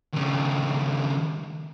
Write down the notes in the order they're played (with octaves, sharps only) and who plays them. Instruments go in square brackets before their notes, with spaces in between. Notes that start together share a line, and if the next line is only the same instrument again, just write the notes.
[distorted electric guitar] D#2 C#3